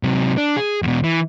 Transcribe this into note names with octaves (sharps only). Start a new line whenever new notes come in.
C3 F#3
D4
G#4
E2 B2
E3